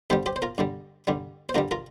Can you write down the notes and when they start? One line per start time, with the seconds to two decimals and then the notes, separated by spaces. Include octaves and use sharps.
0.10 G2 D3 G3 G4 C5
0.26 G4 C5
0.36 C5
0.42 F4 A#4
0.58 G2 D3 G3
1.07 G2 D3 G3
1.49 C5
1.55 G2 D3 G3 F4 A#4
1.71 F4 A#4